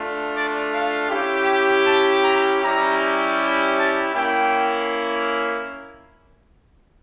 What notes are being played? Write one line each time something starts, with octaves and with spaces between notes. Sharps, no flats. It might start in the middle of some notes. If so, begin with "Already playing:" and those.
Already playing: A3 D4 F4
D5
F5
C#4 E4 G4
A5
A#5
G3 C#4 E4 G4 A#5
A5
A#3 C#4 E4 G5